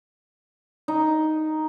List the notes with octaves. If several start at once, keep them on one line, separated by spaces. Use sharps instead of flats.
D#4